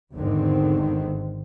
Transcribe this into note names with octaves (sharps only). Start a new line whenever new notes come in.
G#1 E2 G#2 D3 D#3 C4